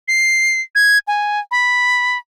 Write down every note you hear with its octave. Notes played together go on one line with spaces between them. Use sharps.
C7
G#6
G#5
B5